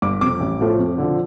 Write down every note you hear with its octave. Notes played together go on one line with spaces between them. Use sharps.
G1 D6
F2 C3 D6
A1
A2 F3 A3
F2
D3 F3